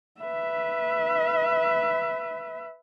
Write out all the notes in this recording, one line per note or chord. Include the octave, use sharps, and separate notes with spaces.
B4 E5